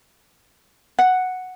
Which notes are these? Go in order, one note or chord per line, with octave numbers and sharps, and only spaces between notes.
F#5